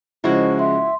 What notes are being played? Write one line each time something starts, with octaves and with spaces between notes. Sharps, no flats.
C#3 F3 G#3 E4 F#4 C5 D#5 C#6
E5 C6